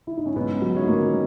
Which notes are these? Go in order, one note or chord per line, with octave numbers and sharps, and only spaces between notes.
E4
D#4
C#4
G#2 B3
F#3
D#3 G#3 C#4 E4
A#3